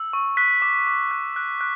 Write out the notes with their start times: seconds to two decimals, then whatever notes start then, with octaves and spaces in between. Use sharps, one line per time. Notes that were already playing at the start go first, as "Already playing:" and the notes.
Already playing: E6
0.13 C#6
0.37 F#6 B6
0.62 D6
0.87 D6
1.11 F#6
1.36 F#6
1.61 F#6